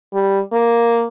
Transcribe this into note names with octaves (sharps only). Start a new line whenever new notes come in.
G3
A#3